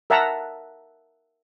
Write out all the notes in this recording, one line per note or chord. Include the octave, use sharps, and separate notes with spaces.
A#4 E5 F#5 A5 A#5